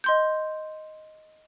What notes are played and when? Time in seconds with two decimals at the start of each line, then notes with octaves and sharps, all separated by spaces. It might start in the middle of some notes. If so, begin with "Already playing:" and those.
0.04 D#5 C6 G6